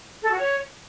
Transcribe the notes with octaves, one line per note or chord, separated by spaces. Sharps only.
A4
F#4
C#5